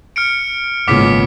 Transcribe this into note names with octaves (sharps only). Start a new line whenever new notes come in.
F6 C#7 D7
G#1 A#2 C#3 G#3 B3 D6 B6